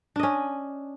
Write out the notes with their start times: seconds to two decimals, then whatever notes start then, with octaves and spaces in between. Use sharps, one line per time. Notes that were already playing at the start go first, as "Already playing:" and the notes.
0.16 D4
0.19 D#5
0.23 C#4